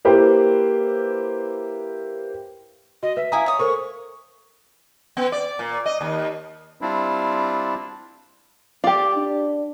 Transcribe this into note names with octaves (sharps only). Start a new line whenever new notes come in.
A#3 E4 G4 B4 C5
F#4 D#5
B4 E5
E4 F5 G#5 A#5 D#6
C#5 D#6
A4 A#4 C5 C#6
B3
D5
A#2
D#5
D#2
G3 C4 D4 E4 F4
F4 G4 D5
D4